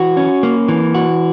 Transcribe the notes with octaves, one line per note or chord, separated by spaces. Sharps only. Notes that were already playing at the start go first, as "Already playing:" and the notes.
Already playing: E3 F#4
C#4
A#3
E3
F#4